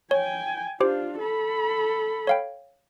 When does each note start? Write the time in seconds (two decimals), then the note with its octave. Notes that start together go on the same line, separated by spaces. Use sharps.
0.11 C#5 G5 G#5
0.81 D4 F4 G4 C5
1.19 A4 B5
2.27 C#5 F5 G5